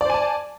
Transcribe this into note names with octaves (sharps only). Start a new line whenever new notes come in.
C5 D5 G#5 A5